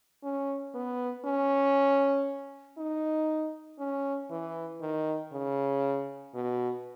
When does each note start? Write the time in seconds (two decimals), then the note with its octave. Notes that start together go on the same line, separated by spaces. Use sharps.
0.23 C#4
0.75 B3
1.25 C#4
2.78 D#4
3.79 C#4
4.30 E3
4.81 D#3
5.32 C#3
6.34 B2